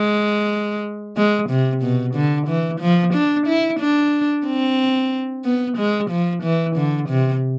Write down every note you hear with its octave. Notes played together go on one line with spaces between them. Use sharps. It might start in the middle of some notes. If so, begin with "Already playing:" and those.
Already playing: G#3
G#3
C3
B2
D3
E3
F3
D4
E4
D4
C4
B3
G#3
F3
E3
D3
C3